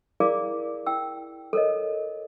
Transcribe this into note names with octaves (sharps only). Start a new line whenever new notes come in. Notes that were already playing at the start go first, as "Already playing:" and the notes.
E4 G#4 A#4 D5 F5 D6
E4 G5 E6
A4 A#4 C#5 D#5